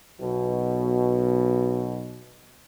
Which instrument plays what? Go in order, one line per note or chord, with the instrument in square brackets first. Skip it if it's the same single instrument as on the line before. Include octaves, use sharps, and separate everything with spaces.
[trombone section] B1 B2